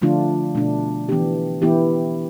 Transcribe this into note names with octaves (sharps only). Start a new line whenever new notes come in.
D3 F3 A3 D4 F4
B2 A3 D4
E3 B3 D4 G4
E3 B3 E4 G4